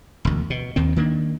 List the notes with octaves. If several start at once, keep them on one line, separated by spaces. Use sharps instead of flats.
E1 D2
B2
D#2 D#3 C4
D#3 A#3 D4